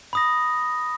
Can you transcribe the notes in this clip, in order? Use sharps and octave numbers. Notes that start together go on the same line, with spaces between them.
B5 D#6 A#6